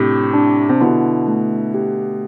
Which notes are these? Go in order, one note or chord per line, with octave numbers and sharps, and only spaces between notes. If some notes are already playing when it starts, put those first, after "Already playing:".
Already playing: A2 C3 D4 G4
D4
C3
B2 D3 E4
A3
G4